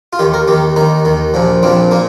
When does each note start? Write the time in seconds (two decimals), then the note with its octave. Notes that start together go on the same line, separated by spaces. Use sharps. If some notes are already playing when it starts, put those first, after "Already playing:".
0.13 F4
0.19 D#2 D#3 G4
0.34 A#4
0.48 D#2 G4
0.53 D#3
0.76 D#2 D#3 D#4
1.05 D#2 D#3
1.34 A#1 A#2 F3
1.63 A#1 A#2 F3 C4
1.91 A#2 A#3